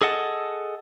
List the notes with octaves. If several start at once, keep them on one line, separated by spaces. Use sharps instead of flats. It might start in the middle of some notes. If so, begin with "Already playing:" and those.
G#4 A4 D#5 F#5 A5